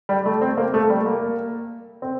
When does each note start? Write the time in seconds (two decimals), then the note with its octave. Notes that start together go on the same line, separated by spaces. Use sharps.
0.09 G3
0.26 A3
0.41 C4
0.57 A#3
0.74 A3
0.90 G3
1.06 A#3
2.02 C4